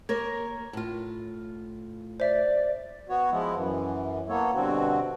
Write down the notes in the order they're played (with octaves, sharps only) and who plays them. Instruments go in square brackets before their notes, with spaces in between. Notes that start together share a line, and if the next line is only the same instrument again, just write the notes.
[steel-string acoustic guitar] A#3 A#4 C#5 [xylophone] G#6
[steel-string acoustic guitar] A2 F4
[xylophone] C5 E5 [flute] D5
[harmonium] B3 F#4 C#5
F3 G#3 B3 E4
F#2 E3
A#3 B3 A4 C#5
G2 B2 D3 C4 F#4